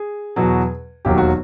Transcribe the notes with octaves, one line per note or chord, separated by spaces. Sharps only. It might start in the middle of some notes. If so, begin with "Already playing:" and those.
Already playing: G#4
E2 B2 F#3
E1 D#2 D#3 F#3 G4
F#4